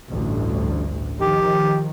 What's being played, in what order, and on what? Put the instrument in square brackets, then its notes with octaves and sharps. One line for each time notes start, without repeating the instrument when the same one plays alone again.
[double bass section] A1 D2 G2
[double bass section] D#3 F3 [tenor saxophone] G4